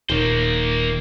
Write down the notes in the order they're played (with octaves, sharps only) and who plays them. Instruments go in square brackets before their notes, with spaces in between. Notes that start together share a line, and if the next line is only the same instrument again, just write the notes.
[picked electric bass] D#1 [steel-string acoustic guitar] D#3 [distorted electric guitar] A#3 C5